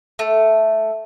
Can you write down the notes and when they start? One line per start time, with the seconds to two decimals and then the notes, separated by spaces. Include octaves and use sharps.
0.19 A3